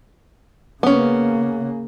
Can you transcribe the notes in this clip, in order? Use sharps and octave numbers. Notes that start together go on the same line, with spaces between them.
C#3 A#3 B3 C#4